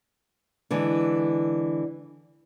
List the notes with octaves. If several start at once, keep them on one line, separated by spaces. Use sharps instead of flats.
D3 E3 G#3